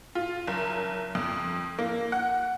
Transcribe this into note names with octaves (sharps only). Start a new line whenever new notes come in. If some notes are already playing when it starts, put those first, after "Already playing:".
F4
F#1
F2
A#3
F#5